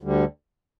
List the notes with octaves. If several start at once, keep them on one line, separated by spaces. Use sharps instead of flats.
D2 D3 G3